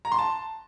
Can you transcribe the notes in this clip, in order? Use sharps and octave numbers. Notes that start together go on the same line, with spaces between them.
A#5
C6
A5